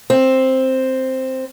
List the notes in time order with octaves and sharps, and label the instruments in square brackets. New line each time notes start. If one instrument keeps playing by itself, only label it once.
[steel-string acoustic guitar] C4